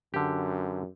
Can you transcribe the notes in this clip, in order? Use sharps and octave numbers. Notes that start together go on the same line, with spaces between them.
F#2 D3 G4